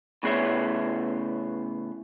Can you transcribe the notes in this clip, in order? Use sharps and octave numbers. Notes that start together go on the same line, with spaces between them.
A2 C#3 B3 G#4 C#5 E5